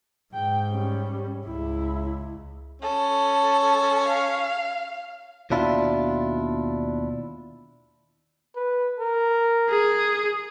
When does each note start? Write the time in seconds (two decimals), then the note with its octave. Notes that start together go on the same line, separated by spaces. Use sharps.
0.34 G#2 G5
0.70 G3 C#4
1.45 C#2 E4
2.82 C#4 A4
4.08 F5
5.50 D#2 B2 D4 E4 F4
8.55 B4
8.99 A#4
9.70 G#4